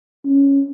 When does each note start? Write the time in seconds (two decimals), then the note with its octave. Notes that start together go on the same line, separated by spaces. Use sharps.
0.25 C#4